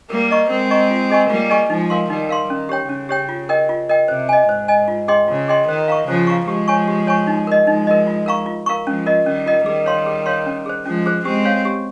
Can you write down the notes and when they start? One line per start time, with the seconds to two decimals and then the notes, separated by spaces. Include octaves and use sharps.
0.10 G3 A#3 A#4
0.31 D#5 A#5 C#6
0.50 G#3 C4 A#4
0.71 D#5 A#5 C#6
0.91 F4
1.10 G#4 D#5 G#5 C#6
1.30 G3 A#3 F4
1.50 G#4 D#5 G#5 C#6
1.70 F3 G#3 D#4
1.90 A#4 F5 C6
2.10 D#3 G3 D#4
2.29 A#4 F5 C6
2.50 D#3 C#4
2.69 G4 C#5 G5
2.89 C#3 C#4
3.09 G4 C#5 G5
3.29 F4
3.49 A#4 D#5 G5
3.69 F4
3.89 A#4 D#5 G5
4.08 C3 C5
4.29 D#5 G#5
4.49 G#2 C5
4.68 D#5 G#5
4.88 F4
5.08 G#4 D#5 G5 C6
5.28 C#3 F4
5.48 G#4 D#5 G5 C6
5.68 D#3 C5
5.88 F5 A#5 C#6
6.07 C#3 F3 C5
6.27 F5 A#5 C#6
6.47 F3 G#3 G4
6.68 C#5 G#5 C#6
6.88 G4
7.07 C#5 G#5 C#6
7.27 D#4
7.47 A#4 D#5
7.67 F3 G#3 D#4
7.87 A#4 D#5
8.07 F4
8.26 A#4 F5 A#5 C#6
8.46 F4
8.66 A#4 F5 A#5 C#6
8.86 F3 G#3 C#4
9.06 F4 A#4 D#5
9.26 D#3 G3 C#4
9.46 F4 A#4 D#5
9.66 D#3 G3 G#4
9.86 C#5 F5 C6
10.06 G#4
10.26 C#5 F5 C6
10.46 C#4
10.66 G#4 C5
10.86 F3 G#3 C#4
11.06 G#4 C5
11.25 G#3 C4 G4
11.45 C#5 F5
11.65 G4